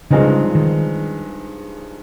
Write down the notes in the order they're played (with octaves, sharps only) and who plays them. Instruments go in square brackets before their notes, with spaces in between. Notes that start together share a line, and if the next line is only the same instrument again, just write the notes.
[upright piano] G2 F3 G#3 C4 D#4 [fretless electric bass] C#3
[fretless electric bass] D#3